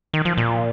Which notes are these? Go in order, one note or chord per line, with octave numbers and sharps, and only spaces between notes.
D#3
F3
A#2